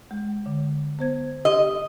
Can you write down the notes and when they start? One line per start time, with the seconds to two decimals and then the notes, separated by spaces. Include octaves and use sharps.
0.11 G#3
0.46 D3
0.99 B3 C5 G#6
1.45 G4 D#5 C6 E6